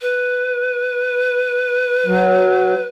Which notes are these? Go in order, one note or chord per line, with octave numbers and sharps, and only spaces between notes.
B4
F#3